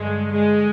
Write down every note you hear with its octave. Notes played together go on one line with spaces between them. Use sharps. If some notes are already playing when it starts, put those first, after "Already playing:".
Already playing: G2 D3 G#3
G#3